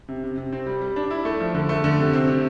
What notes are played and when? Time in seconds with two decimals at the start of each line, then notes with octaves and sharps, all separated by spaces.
0.08 C3
0.24 C3
0.37 C3
0.53 C4
0.67 G3
0.82 G3
0.96 D4
1.11 E4
1.25 A3
1.40 F3
1.55 D3
1.69 A3
1.84 D3
1.99 C3
2.13 C4
2.27 C3